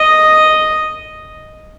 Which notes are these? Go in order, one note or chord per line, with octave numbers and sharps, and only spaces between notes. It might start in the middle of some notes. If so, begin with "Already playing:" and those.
Already playing: D#5